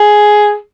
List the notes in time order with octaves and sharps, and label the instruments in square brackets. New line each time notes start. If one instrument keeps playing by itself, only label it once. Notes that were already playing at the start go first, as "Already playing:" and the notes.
Already playing: [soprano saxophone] G#4